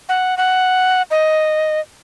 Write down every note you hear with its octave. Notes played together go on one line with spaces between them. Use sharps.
F#5
F#5
D#5